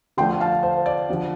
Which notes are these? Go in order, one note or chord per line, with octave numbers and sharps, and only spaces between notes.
D3 F3 A3 D4 G5 C6
F5 A5
C5
D5
D3 F3 D4